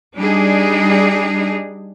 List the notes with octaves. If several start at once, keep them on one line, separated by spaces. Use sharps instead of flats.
G3 D4 D#4 G#4